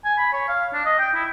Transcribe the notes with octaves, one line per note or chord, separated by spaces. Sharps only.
G#5
B5
C#5
F5
D4
D#5
G5
E4